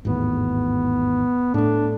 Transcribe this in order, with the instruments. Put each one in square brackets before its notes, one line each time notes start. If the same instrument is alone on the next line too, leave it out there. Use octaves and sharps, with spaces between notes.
[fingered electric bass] G#1 E2 A2 [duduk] B3
[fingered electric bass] A2 A3 [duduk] D4